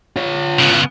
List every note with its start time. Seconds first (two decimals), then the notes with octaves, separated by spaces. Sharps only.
0.16 F4 C#5
0.60 C#3 B3